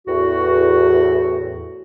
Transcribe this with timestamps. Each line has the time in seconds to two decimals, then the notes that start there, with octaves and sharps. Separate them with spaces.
0.08 E2 A2 F#4